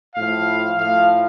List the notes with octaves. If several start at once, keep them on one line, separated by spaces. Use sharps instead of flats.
A2 F3 F5
A2 F3 F5